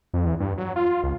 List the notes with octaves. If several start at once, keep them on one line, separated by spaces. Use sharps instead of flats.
F2
E2
G2
F#3
F4
C#2